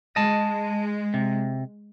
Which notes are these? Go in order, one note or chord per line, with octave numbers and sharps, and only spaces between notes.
G#3 D#5 A5
C3